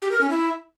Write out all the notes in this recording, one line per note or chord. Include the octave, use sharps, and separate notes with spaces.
G4
A#4
C#4
E4